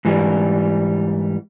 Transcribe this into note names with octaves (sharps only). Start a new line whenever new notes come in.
G#2 E3 G3